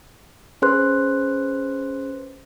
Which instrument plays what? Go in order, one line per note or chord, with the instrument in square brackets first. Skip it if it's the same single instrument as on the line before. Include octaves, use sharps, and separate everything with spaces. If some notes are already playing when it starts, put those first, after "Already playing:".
[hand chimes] C#4 G#4 B4 C5 C6 F#6